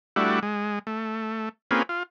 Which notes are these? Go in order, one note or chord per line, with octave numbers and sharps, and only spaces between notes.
G3 A3 D4 E4 F#4
G#3
A3
A#3 C4 C#4 F4 G#4 B4
F4